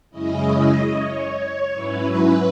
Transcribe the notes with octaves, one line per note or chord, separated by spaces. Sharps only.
F#2 C#3 G#3 C#4 E4 D#5
D#5
C#5
C#5
G#2 F#3 C#4 E4 B4